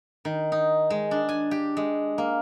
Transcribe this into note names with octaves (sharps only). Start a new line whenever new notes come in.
D#3
D#4
G#3
D4
G#5
G4
G#3
A#3